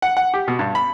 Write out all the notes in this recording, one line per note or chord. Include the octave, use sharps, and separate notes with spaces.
F#5
F#5
G4
B2
G2
B5